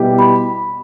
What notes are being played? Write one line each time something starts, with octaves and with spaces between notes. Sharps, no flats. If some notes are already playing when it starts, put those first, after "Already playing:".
Already playing: B2 G3 B3 E4 G4
B5